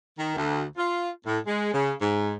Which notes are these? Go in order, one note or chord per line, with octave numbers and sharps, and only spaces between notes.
D#3
D2
F4
A2
G#3
C#3
G#2